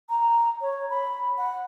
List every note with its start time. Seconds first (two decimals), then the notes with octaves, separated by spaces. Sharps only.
0.09 A#5
0.61 C#5
0.90 B5
1.38 F#5